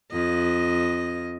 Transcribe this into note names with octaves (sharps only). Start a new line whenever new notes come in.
F2 D#5